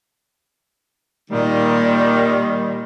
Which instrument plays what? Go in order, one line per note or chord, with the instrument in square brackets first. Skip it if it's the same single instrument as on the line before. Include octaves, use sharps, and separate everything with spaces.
[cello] A#2 [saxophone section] D#3 G3